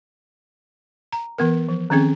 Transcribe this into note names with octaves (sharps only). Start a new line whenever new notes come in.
A#5
E3 B3 A#4
F3
D#3 F3 C4 C#4 G#4